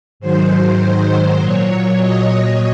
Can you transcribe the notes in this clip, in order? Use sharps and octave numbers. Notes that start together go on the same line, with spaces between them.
G#2 D#3 F#3 C5
A#2 F#3 C#5
D#5